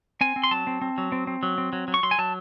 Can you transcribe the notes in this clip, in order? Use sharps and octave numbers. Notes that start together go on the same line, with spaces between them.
C4 G#5
C4
C6
F#3 A5
C4
C4
F#3
C4
C4
F#3
C4
F#3
F#3
C#6
F#3 C6
G#5
F#3 A5